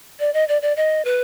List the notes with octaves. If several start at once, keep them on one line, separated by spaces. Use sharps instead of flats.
D5
D#5
D5
D5
D#5
B4